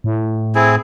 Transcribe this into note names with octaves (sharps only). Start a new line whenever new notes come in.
A2
C4 E4 G#4